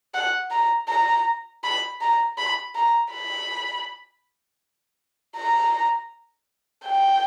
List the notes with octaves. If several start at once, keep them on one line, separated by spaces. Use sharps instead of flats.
F#5
A#5
A#5
B5
A#5
B5
A#5
B5
A#5
G5